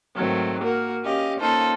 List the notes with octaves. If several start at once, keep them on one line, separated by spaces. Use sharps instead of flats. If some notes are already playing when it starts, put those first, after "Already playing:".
G#2 D#3 F#3 A3 C4
A#3 F#4 A#4
C#4 G4 D#5 F5
A#3 C#4 D#4 F4 A4 C5